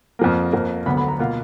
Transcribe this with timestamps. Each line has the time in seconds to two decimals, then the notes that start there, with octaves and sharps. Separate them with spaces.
0.19 F2 F3 A#3
0.52 F2 F3 A#3
0.86 D2 D3 F#3 B3 B5
0.97 B5
1.08 A#5
1.19 B2 A#3 F4 F#5